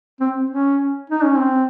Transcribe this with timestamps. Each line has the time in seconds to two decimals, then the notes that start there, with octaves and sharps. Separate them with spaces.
0.20 C4
0.50 C#4
1.10 D#4
1.24 C#4
1.37 C4